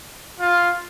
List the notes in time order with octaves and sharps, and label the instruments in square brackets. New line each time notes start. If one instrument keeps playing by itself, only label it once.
[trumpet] F4